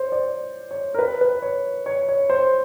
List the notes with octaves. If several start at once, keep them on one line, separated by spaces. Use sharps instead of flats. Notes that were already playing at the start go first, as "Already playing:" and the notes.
Already playing: C5 C#5
D5
C#5
A#4
B4
B4
C#5
C#5
C#5
C5